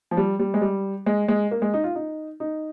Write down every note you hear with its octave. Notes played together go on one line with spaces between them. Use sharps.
F3
G3
G3
G#3
G3
G#3
G#3
A#3
G#3
D#4
F4
D#4
D#4